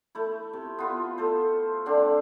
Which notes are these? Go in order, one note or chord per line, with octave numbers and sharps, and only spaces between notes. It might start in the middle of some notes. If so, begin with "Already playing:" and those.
A3 E4
C3
B3 F4
A3 A4 C5
D3 A3 C4 D4